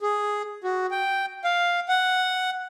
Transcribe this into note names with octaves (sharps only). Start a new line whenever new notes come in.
G#4
F#4
G5
F5
F#5